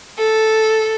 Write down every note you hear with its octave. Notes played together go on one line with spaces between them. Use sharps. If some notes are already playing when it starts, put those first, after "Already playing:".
A4